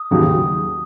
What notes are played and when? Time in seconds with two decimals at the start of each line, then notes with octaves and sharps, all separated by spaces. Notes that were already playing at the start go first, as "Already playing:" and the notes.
Already playing: D#6
0.11 D#2 C#3 F#3